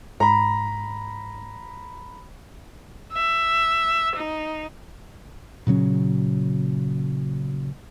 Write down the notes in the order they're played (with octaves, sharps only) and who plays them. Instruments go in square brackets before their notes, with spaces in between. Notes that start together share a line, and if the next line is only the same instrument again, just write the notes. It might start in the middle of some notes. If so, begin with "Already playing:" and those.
[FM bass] G#2 [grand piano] A#5 B5
[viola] E5
D#4
[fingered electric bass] A#2 C#3 F#3 C#4